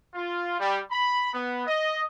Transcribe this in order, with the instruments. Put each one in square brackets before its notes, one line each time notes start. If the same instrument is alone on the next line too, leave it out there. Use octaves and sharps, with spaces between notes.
[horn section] F4
G3
B5
B3
D#5